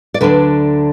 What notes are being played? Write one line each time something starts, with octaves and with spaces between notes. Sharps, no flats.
D5
D2 D3 F#3 D4 B4